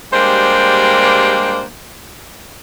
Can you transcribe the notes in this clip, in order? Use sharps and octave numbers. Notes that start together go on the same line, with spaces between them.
G3 G#3 A#3 D4 G4 C5